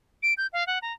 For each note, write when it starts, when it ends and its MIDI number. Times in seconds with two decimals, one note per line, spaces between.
0.23 0.34 98
0.37 0.47 91
0.53 0.66 77
0.67 0.79 78
0.82 0.93 82